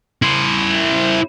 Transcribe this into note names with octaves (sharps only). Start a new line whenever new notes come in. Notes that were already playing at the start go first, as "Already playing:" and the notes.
E4 C5